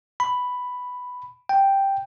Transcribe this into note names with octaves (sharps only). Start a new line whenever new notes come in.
B5
G5